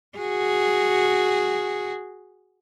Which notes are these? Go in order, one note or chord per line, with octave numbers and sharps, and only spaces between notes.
F#4 G#4